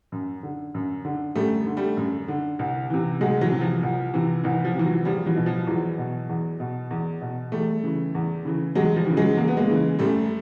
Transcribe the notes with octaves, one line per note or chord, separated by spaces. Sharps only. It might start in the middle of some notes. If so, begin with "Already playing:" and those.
F#2
D3
F#2
D3
F#2 G3 A3
D3
G3 A3
F#2
D3
C2
C3 E3
C2 F#3 G#3
E3 F#3
C3 E3
F3
C2
C3 E3
C2 E3
F3
C3 E3
E3 F#3
E2 F3 G3
E3 F#3
B2
F3
E2 E3 F#3
B2
E2
B2
E2
B2
E2 G3 A3
C#3 E3
E2
C#3 E3
E2 F#3 G#3
F3 G3
C#3 E3
F#3 G#3
E2 A#3
B3
G#3 A#3
C#3 E3
F#2 G3 A3